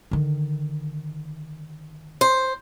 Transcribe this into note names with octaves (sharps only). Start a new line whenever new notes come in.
D3 D#3
C5